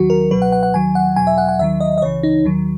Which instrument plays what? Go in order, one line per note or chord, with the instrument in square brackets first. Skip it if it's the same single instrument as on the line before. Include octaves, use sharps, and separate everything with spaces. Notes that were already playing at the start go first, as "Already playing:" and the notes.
Already playing: [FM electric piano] D#2 D#3 F#3 F#4
A#4
C#2 B2 F#3 B4
F#5
F#5
F#5
D#2 D#3 F#3 G#5
F#5
E2 B2 F#3 G#5
E5
F#5
F#5
D#2 D#3 F#3 E5
D#5
D#5
C#2 C#3 E3 C#5
D#4
D#2 D#3 F#3